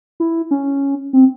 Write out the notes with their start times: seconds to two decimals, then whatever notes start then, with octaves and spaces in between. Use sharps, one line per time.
0.20 E4
0.51 C#4
1.13 C4